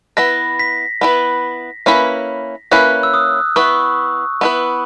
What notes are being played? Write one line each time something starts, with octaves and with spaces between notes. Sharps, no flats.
B3 E4 B4 A#6
B6
B3 E4 B4
A#3 C#4 E4 B4
A#3 C#4 E4 B4 F#6
E6
D#6
B3 E4 B4 C#6
B3 E4 B4